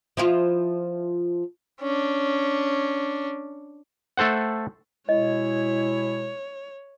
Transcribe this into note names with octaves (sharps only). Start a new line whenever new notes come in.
F3 E4 F4
C#4 D4
A3 A4 C5 F#5
B2 G#3 E4 C#5 D#5